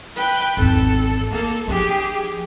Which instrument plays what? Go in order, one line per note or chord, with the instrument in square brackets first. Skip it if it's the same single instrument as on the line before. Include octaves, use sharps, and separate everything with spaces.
[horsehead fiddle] B4 G5
[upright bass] G#1 E2 [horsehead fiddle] A4
[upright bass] A3 [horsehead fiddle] A#3 A4
[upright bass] F3 D4 [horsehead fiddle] G4 G#4